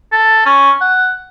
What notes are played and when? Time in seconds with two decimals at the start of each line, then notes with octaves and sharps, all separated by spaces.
0.12 A4
0.46 C#4
0.81 F#5